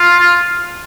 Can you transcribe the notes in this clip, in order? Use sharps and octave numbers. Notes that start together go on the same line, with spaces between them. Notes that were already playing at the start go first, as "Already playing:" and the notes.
Already playing: F4